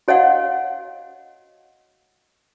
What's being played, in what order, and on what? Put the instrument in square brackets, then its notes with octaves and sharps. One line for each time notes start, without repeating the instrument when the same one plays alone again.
[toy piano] F#4 C#5 D#5 F5 F#5